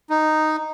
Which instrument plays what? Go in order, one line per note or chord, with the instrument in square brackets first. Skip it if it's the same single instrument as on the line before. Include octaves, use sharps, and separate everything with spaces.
[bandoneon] D#4